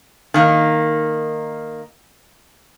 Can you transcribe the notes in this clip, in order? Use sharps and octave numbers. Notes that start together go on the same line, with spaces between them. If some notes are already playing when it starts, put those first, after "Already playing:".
D#3 A#3 D#4